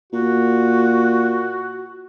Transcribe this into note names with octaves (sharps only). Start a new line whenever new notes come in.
A#2 F#4